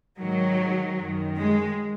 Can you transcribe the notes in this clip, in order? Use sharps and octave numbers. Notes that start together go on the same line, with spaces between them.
G#2 D#3 F#3
F#2 D#3
G#3